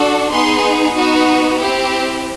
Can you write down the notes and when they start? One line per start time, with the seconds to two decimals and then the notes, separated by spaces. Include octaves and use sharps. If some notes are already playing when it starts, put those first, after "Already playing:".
Already playing: D4 F#4 A4
0.30 B3 D#4 G#4 C6
0.94 B3 D#4 F#4
1.60 C4 E4 G4